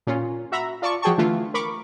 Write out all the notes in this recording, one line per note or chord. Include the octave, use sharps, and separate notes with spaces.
A#2 C#4 F4
F#4 E5 A#5 B5
F4 D5 A5 C#6
F3 F#4 G#4 G5 A5 C#6
D3 E3 A3 F4
A#4 B5 C#6 D6